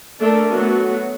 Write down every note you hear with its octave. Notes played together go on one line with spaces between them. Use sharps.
A3 D4 A4 A#4
F#3 A3 B3 F#4